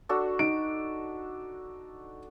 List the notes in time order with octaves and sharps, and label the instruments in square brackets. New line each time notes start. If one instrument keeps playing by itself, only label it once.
[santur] D4 F#4 A4
[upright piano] D#4 D7